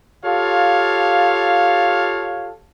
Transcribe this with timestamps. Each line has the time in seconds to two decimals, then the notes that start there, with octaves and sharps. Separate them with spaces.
0.24 F4 G4 A4 C#5 F5